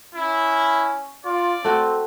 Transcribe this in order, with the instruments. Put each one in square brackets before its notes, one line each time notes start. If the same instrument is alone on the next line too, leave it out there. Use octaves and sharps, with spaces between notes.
[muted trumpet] C#4 [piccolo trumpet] E4
[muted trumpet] F4 [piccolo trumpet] D5
[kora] A3 F#4 [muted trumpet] C4